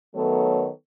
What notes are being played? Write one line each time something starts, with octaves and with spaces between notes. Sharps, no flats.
D#3 F#3 A3 B3 A4 C#5